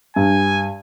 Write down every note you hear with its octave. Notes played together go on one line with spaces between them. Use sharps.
G2 G#5